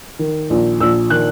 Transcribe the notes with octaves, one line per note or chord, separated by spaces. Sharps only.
D#3
A#1
A#1 E6
D#3 F#6